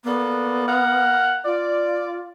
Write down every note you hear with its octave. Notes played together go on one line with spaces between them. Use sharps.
A#3 B3 A4 D5
A#4 F5 F#5
F4 D5